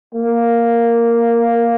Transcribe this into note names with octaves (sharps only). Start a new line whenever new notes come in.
A#3